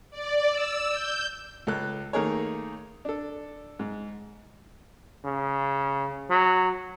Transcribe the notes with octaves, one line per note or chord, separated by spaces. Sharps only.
D5
E6
G6
C#2 A4 F#6
D#3 A3 A#3 G#4 A#4 C#5
D4 A4
G#2
C#3
F#3